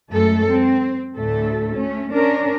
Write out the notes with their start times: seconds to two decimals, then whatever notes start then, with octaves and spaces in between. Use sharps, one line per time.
0.11 F#2 G#3 A3 A4
0.50 C4
1.16 D2 A2 A3 A4
1.75 A3 C#4
2.12 C#4 D4 A#4